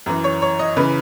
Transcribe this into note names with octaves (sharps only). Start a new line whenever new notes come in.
F#2 E3
C#5
C#5
D#5
C#3 E3 B4